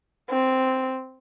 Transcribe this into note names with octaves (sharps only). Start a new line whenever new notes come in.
C4